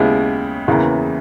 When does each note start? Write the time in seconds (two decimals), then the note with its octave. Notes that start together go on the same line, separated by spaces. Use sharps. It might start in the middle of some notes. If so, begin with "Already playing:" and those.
Already playing: D#2 C#3 G#3 B3 E4
0.68 E2 C#3 E3 A#3